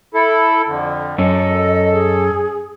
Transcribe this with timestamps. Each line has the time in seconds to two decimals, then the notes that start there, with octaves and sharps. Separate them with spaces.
0.14 E4 A4
0.67 F2 D3
1.18 F#2 C#4 A4 D#5
1.93 G#4